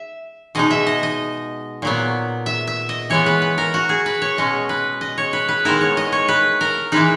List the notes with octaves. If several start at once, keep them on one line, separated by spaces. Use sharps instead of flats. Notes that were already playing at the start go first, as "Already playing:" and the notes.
Already playing: E5
B2 G#3 D#4 D#5
E5
D#5
D#5
A#2 F#3 B3
E5
E5
D#5
E3 G#3 B3 C#5
B4
B4
A#4
F#4
G#4
B4
C#5
B2 G#3 C#4 D#5
B4
D#5
C#5
B4
B4
D#3 G#3 B3 E4 A#4
C#5
D#5
C#5
B4
A#4
E3 G#3 D#4 B4